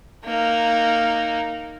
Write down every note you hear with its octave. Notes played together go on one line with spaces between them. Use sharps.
A#3 D#4